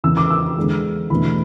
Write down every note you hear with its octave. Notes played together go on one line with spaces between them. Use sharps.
E2 C#3 E3 E6
D6
E6
E2 D3 G#3
E2 B2 A3 D4 B5